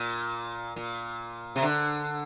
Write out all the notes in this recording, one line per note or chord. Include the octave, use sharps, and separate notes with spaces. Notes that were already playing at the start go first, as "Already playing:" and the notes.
Already playing: A#2
A#2
C3
D3